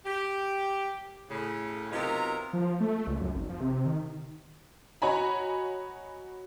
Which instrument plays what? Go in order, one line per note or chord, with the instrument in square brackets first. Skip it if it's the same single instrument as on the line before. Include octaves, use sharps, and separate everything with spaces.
[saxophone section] G4
A2 C#3
C3 F#3 B3 D#4 F4 A#4
[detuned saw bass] F3
A3
C#2
F#2
G#1
F3
C3
D#3
[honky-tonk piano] F#4 C#5 D#5 G#5 A#5 B5